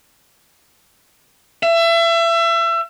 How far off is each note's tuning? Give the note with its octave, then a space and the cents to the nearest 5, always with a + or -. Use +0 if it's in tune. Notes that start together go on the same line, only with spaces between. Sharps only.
E5 +30